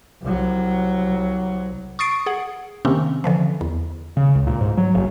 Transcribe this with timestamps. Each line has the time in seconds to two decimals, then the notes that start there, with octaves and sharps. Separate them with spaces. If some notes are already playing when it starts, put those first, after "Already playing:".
0.22 C2 F#3
1.99 C#6 D#6 A6 C7 D7
2.26 G#4 F#5
2.85 C3 D#3 A#3 C4 C#4
3.24 D3 E3 F3
3.61 E2
4.17 C#3
4.35 C#2
4.47 A#2
4.61 G#2
4.77 F#3
4.95 F#1